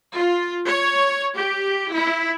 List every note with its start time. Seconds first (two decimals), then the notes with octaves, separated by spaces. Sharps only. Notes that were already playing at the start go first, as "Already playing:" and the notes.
0.15 F4
0.66 C#5
1.36 G4
1.93 E4